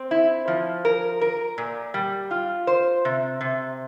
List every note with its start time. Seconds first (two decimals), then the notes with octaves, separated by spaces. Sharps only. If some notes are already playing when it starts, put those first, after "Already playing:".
Already playing: C4
0.11 E4
0.48 F3
0.85 A#4
1.21 A#4
1.58 A#2
1.94 G3
2.31 F4
2.67 C5
3.05 C3
3.41 C3